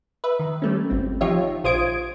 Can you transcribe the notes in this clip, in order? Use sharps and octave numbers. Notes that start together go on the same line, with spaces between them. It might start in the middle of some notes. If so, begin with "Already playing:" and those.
B4 E5
D#3
G3 A3 C#4
G#1 C4
F3 D#4 F4 G4 C#5 E5
A#1 F4 C5 D#6 G#6 D7